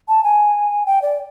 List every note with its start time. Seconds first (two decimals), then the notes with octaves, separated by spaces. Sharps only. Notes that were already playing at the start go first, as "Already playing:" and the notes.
0.09 A5
0.24 G#5
0.86 G5
1.02 D5